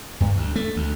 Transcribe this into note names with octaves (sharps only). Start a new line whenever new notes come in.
G2
D2
A3
D2